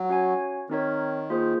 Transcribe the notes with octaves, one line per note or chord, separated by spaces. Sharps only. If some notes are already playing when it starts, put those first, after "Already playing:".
Already playing: F#3
C#4 F#4 C#5 G#5
D#3 C4 D#4 A#4 C#5
A#3 F4 G#4 C5